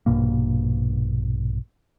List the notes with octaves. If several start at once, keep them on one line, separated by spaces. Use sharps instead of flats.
A#1 G2 B2 A#3